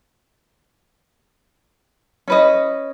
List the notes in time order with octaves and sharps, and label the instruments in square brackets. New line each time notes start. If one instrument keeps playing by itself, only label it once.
[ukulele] C#4 B4 D#5